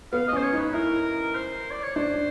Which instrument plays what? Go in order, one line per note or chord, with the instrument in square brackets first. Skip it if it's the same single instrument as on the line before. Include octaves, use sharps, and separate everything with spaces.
[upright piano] B3 [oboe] F5
[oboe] D#5
[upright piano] C#4
[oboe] C5
C#5
[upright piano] D#4
[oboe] B4
[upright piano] E4 [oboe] A#4
[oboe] C5
D5
C#5
[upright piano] D4 [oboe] C5